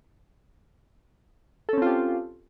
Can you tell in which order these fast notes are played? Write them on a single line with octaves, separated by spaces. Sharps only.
A4 C#4 C4 F4 G4